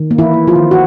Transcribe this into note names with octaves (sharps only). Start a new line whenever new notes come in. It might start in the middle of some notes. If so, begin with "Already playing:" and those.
Already playing: D#3
A#3
E3 E4
A#3
F3 F4
D#3
F#4